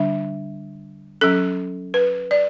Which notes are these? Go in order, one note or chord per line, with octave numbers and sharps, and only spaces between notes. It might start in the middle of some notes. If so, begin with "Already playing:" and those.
Already playing: D3 G3 D4 E5
F#3 C#4 A4
B4
D5